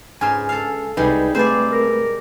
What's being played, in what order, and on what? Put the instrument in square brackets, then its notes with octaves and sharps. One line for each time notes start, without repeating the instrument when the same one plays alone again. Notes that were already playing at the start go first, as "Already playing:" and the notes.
[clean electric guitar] C#2 [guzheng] G#2 C6 [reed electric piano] G#5 F6
[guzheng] A4 F5
[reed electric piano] C2 B4 [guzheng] C3 G3 G#3 [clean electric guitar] D#4
[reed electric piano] A3 B4 [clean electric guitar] C4 G#4 [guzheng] C5 D5
[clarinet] A#4